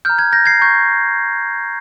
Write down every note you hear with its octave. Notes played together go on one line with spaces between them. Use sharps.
A#5 F6 G6
G#6
G6 A#6
G#6 C7
A#5 C#6 G6